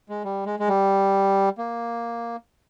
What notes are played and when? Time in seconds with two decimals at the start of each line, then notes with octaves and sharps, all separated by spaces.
0.09 G#3
0.24 G3
0.46 G#3
0.59 G#3
0.69 G3
1.58 A#3